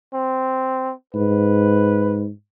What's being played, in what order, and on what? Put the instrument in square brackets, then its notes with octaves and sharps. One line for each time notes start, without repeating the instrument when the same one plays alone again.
[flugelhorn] C4
[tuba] G#2 [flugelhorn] B4